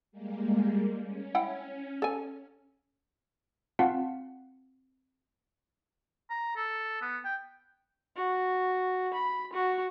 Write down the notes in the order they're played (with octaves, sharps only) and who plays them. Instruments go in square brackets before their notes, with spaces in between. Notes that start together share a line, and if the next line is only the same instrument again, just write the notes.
[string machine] G3 G#3 A#3
C#4
[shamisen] E4 F#5 G5
A4 G#5
[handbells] C4 F4 F5 F#5 A5
[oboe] A#5
A4
B3
G5
[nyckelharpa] F#4
B5
F#4